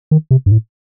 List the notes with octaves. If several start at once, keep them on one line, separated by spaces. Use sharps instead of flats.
D#3
C3
G2
A2